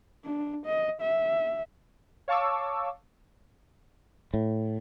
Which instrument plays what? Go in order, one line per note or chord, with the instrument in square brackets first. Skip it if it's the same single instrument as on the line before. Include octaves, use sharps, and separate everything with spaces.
[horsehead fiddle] D4
D#5
E5
[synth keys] C#5 F5 A5 C#6 D6 E6
[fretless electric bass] A2